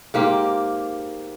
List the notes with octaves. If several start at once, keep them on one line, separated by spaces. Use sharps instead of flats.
G#2 A#3 G4